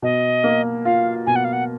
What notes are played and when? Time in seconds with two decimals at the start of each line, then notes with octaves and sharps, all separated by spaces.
0.02 B2 D#5
0.44 A#3
0.85 F4 F5
1.26 B2 G#5
1.36 F#5
1.44 F5
1.53 F#5